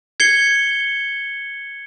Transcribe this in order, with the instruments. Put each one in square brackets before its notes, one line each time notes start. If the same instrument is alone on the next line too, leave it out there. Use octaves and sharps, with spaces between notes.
[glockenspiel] G#6 C7 C#7 G7